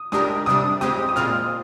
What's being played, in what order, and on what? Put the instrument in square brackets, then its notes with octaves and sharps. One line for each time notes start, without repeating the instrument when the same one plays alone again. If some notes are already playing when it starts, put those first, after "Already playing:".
Already playing: [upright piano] D#6
[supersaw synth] G#3 D4 G4 A#4 [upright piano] D#6
[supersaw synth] C3 G3 D4 [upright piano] D#6
[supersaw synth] G#3 C4 G4 [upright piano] D#6
[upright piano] D#6
[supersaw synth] A#2 G#3 C4 F4 [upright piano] F6